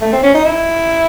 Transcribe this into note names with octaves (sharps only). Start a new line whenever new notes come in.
A3
C4
C#4
D#4
E4